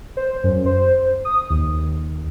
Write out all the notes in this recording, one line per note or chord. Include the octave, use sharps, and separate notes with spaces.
C5
F#2
C5
D#6
D#2